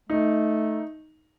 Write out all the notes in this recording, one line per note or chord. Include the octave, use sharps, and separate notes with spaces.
A3 D#4